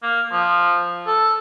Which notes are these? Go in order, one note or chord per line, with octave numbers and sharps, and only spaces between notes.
A#3
F3
A4